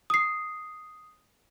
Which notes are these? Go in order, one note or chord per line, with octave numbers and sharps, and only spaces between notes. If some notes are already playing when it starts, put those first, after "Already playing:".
D#6 C7